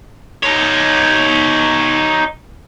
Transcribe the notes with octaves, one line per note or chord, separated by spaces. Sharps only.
D#4 C#5